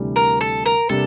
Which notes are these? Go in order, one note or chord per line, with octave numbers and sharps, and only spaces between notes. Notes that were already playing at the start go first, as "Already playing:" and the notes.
Already playing: D2 C3 E3 G3 D4
A#4
A4
A#4
C3 G3 A#3 D4 A4